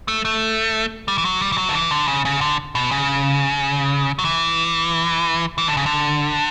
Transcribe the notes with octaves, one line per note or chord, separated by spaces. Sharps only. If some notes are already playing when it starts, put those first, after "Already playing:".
A3
A3
G3
E3
F#3
G3
E3
F#3
D3
E3
D3
C#3
C#3
D3
B2
C#3
F#3
E3
E3
D3
C#3
D3